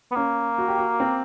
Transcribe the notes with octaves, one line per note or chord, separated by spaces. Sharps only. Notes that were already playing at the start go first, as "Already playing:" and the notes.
B3
A#3 C#4
F#4
G4
F#4
C4